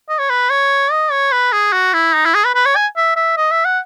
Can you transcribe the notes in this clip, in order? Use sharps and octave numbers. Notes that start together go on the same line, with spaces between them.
D#5
C#5
B4
C#5
D#5
C#5
B4
G#4
F#4
E4
D#4
E4
G#4
B4
B4
C#5
G#5
E5
E5
D#5
E5
F#5